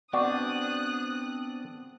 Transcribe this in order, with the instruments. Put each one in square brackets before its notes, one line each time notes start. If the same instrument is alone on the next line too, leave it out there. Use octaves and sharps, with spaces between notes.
[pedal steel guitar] B3 C4 D4 [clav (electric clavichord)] F#4 D5 [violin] D#6 F#6